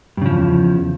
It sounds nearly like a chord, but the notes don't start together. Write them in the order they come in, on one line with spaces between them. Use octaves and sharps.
G2 C#3 F3 E2